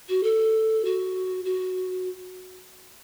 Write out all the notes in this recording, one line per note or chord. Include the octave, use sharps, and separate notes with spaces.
F#4
A4
F#4
F#4